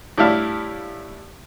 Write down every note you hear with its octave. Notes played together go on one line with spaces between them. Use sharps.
A2 G3 D4 E4 G4 F5